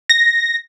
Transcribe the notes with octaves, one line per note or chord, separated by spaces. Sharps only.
A#6